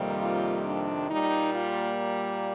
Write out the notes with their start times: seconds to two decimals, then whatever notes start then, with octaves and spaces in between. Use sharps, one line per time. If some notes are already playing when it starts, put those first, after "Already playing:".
Already playing: F2 C3 D#3 G3 A#3
0.19 F4
0.65 D4
1.09 A#2 G3 A#3 D#4
1.55 F4